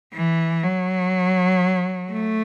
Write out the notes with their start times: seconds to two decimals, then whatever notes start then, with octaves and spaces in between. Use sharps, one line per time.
0.13 E3
0.63 F#3
2.11 A3